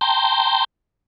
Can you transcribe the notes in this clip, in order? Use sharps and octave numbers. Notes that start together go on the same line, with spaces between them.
G5 A5 A#5 C6 G6